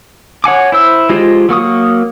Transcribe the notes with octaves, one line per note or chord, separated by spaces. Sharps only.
C#5 F#5 G#5 D6
E4 C5 E6
G#3 F4 G4 C5 D#5
F#3 A#3 C#6 D#6